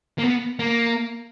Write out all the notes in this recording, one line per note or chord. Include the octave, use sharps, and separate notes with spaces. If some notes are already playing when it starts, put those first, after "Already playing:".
A#3
B3
A#3